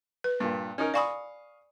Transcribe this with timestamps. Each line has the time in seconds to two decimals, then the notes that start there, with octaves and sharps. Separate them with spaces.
0.24 B4
0.40 G2 A#2
0.78 C#4 D#4 A#4
0.94 D5 F5 G#5 B5 C#6 D#6